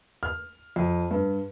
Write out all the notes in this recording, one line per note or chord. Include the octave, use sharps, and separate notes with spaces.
F6
F2
G2